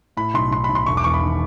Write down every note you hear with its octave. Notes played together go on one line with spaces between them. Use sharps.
A2 B5
B1 C6
B1 C6
B1 B5
C6
E1 C#6
D6
E2 C#6
B5
D#3